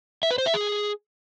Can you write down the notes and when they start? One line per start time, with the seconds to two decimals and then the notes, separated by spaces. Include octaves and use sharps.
0.23 E5
0.31 B4
0.38 C5
0.46 E5
0.54 G#4